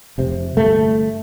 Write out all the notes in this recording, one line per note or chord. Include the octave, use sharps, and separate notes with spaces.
F1 C3
G1 A3